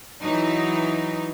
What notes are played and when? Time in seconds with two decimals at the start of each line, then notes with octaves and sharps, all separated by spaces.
0.22 E3 F#3 D#4